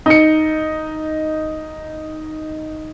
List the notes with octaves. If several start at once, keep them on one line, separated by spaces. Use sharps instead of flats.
D#4 C#7